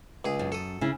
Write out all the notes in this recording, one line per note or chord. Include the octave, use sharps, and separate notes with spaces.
C#2 G#4
F#2
A4 D#6
C#3 E4